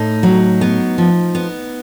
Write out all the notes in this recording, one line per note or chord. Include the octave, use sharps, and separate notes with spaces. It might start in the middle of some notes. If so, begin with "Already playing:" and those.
Already playing: A2 D#4
F#3
B3
F3
B3